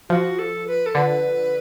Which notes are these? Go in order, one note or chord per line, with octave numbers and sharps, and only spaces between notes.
F3 F#4
A4
B4
A4
D3 B4